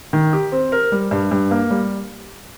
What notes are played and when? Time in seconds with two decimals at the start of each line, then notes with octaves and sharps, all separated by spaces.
0.13 D#3
0.33 G4
0.52 C4
0.72 A#4
0.92 G3
1.11 G2
1.31 G2
1.51 A#3
1.70 G3